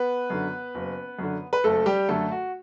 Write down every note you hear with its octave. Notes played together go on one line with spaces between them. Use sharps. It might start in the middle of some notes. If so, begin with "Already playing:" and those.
Already playing: B3 B4
F#2 D3
F#1
F#2 D3
B4
F#1 A3 A4
G3 G4
F#2 D3 A3 A4
F#4